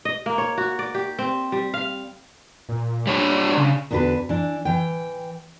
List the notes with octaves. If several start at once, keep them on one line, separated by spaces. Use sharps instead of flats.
D#5
A#3
C#5
F#4
D5
G4
C4
G3
F5
A#2
G3 D4 C#5
C#3
E2 D3 D4 F#4 B4
E3 D4
E3 G5